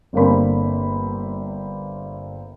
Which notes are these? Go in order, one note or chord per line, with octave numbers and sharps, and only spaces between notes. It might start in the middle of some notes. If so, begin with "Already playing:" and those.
G1 D3 A#3 C4 B5